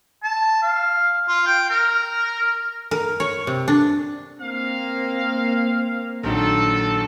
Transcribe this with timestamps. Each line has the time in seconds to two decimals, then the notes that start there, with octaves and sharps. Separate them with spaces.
0.23 A5
0.62 F5
1.28 F4
1.47 G5
1.70 A#4
2.91 A#4
3.20 C#5
3.47 C3
3.68 D4
4.40 A#3 C4 F5
6.23 A#1 D#3 F#3 A4